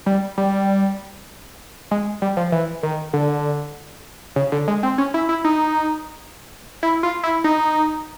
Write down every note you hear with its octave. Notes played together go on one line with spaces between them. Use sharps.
G3
G3
G#3
G3
F3
E3
D#3
D3
C#3
D3
G#3
C4
C#4
E4
E4
D#4
E4
F4
E4
D#4